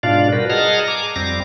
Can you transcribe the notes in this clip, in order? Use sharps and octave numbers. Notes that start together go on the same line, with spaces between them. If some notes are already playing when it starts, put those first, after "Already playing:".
G#2 B2 D4 F4 D5 F5
G3 F#4 A#4 B4
G#4 D#5 F#5 A5 A#5 F6
G#5 A#5 D6
F2 G3 C4 D6 A#6